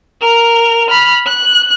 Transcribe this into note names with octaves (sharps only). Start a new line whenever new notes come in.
A#4 F7
B5 F6
F#6